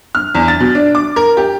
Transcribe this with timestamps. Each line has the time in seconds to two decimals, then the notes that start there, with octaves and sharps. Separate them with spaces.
0.15 F6
0.35 E2
0.48 A6
0.60 B2
0.75 D4
0.95 D6
1.16 A#4
1.37 G4